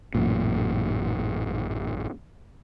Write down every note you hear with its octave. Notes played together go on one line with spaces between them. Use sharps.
A1 F#2 A#2